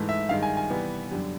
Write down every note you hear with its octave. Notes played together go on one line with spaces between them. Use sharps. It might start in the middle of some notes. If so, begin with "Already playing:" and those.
Already playing: G#2 E3 A3
E5
G2 D#3 G#3 F5
G#5
G#5
C3 E3 G3 B3
F#2 D3 G3